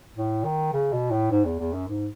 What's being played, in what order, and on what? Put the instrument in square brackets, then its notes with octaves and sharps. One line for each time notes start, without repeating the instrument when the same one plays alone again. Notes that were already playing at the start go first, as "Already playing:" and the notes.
[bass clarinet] A2
D#3
C#3
B2
A2
G#2
E2
E2
F#2
G#2